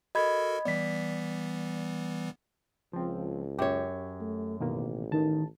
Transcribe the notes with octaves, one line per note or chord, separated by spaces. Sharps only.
F#4 A4 A#4 D#5 B5 G#6
E3 G3 B3 D5 B6
C#2 F3 C4
F#2 G4 C#5
A3
A1 B2 D#3 A#3
D#3 A5